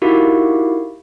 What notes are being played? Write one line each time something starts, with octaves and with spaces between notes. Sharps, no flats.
D#4 E4 F#4 G4 A#4 F5